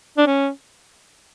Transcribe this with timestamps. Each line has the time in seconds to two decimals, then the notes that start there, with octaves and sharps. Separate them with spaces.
0.18 D4
0.27 C#4